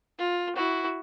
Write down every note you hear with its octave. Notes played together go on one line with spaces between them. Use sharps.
F4
E4 F#4